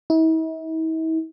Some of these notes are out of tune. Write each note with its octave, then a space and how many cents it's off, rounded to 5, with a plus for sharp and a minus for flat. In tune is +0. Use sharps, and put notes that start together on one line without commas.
E4 -45